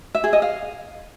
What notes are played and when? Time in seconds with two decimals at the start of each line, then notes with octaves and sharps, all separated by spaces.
0.15 E5
0.24 G#4
0.33 D#5
0.42 F5